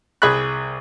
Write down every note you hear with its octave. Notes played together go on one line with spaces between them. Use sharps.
C2 G#4 B5 F#6